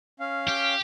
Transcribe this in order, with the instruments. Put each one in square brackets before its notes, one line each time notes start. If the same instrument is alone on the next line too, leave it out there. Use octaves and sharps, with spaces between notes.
[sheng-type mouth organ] C#4 F5
[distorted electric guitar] G4